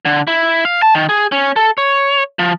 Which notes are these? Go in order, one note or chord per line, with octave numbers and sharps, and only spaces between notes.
D3
E4
F5
A5
D#3
G#4
C#4
A4
C#5
F3